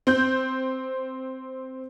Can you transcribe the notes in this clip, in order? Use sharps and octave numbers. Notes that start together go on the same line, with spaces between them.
C4 G6